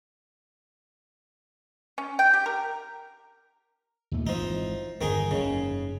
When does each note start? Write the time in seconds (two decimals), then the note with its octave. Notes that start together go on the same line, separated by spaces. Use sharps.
1.98 C#4
2.19 G5
2.33 G4
2.46 A#4
4.11 D#2 A#2 A3
4.27 G#1 E3 F3 D#4
5.01 G1 E2 D#3 D#4 G#4
5.31 F#1 G#2 C#3